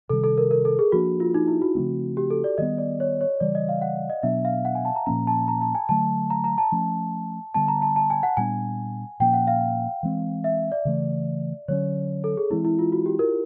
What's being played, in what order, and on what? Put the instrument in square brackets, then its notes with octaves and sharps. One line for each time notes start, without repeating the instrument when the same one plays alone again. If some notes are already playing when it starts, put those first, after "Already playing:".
[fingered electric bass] C3 D#3 G3 [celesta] A4
[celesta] A4
A#4
A#4
A4
G#4
[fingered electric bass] F3 A#3 D4 [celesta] F#4
[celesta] F4
D#4
E4
F#4
[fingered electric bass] C#3 F3 A3 C4
[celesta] G4
A4
D5
[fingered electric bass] D#3 G3 B3 [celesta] D#5
[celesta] D5
C#5
C#5
[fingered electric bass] C#3 E3 G3 [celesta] D5
[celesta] D#5
F5
F#5
D#5
[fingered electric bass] B2 F#3 B3 D4 [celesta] E5
[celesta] F5
F#5
G#5
A5
A#5
[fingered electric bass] A#2 F3 A#3 C#4 [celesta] A#5
[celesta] A5
A#5
A5
G#5
[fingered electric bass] D3 F#3 A3 [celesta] A5
[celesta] A#5
A#5
A5
[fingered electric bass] F3 A3 C#4
[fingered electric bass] D3 G3 B3 [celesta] A5
[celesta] A#5
A5
A5
G#5
F#5
[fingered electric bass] A#2 G3 B3 D4 [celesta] G#5
[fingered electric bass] A#2 F3 A#3 C#4 [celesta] G5
[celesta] F#5
F5
[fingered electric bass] E3 G#3 C4
[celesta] E5
D5
[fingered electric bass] C#3 E3 A3
[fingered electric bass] D3 F#3 A3 C#4 [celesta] C#5
[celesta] A4
G#4
[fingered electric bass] E3 G#3 C4 [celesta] E4
[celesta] E4
F4
F#4
G4
A#4